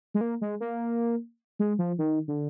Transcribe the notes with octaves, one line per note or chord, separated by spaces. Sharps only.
G#3
A#3
G#3
A#3
G#3
F3
D#3
D3